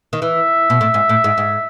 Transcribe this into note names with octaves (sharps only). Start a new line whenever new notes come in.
D#3
E3 E5
B2
A2
G#2
A2
G#2
G#2